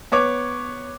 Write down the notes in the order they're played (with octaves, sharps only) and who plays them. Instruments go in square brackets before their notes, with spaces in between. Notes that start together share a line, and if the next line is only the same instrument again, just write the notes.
[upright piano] B3 C#5 D6